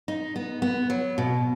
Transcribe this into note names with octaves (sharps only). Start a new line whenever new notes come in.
D#4
B3
B3
F#3
B2